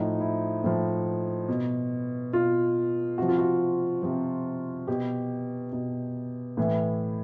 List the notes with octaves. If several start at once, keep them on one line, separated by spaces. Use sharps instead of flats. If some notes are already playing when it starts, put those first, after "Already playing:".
Already playing: A2 F3 D#4
E4
A2 F3
B2
B2 F4
C3 F3 F#4
F4
F#4
C3 F3
B2 G4
B2
A2 E3